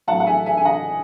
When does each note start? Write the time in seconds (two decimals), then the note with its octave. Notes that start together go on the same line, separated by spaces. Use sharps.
0.07 A2 F#3 F#5 A5
0.20 F#5
0.26 E5 G#5
0.46 E5 G#5
0.57 G#5
0.65 D#5 F#5